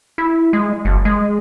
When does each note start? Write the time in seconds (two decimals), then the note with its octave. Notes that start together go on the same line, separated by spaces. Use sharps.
0.18 E4
0.53 G#3
0.85 F#1
1.05 G#3